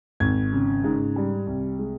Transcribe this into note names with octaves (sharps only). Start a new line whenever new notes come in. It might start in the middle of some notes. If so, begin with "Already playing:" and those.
G#1 G#6
C#3
G#2
G3
C2
G#3